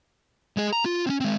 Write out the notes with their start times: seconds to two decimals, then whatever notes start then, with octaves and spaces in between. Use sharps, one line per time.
0.57 G#3 G#4
0.73 A#5
0.85 F4
1.07 C4 C#4
1.20 G#3 C4